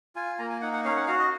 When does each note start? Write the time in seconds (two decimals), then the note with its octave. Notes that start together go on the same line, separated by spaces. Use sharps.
0.16 F4 G#5
0.39 A#3 A#5
0.50 G#5
0.61 D#4 F#5
0.73 F#5
0.84 C#4 F5
0.97 F#5
1.07 F#4 F5
1.19 D#5